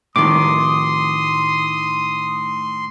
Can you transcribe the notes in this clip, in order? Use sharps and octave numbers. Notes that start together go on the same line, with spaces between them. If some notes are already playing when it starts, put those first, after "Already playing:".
A2 D#3 C6 D6 D#6